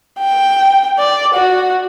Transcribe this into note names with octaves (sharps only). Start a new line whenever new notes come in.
G5
D5
F#4